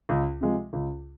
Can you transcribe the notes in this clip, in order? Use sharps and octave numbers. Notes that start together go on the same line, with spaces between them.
C#2
C3 F3 G#3
C#2